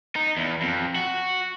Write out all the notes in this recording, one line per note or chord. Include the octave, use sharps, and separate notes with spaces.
D#4
E2
F2
F#4